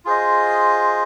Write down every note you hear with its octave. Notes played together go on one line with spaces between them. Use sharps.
F4 G#4 C5 D#5